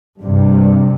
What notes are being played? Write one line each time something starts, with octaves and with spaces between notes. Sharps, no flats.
G2 C3